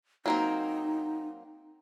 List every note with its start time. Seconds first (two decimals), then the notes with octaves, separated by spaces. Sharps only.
0.26 F#3 A#3 C4 D#4